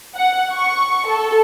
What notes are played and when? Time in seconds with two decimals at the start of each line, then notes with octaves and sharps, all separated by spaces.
0.15 F#5
0.52 C#6
1.07 A4